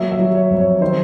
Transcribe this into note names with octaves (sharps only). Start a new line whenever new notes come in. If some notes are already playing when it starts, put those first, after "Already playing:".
Already playing: F#3 A#3 E5
E5
F#3
C#5
F2
C#5
D#3 C5